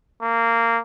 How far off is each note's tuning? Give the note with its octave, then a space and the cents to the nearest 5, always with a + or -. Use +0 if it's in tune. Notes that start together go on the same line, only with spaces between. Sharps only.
A#3 -15